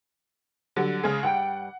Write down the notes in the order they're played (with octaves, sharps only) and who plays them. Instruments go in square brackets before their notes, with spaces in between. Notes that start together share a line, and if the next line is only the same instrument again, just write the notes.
[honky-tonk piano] D3 F#3 G3
C#3 G#3 G#4
[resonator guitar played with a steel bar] G2 G3 G5 [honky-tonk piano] F#5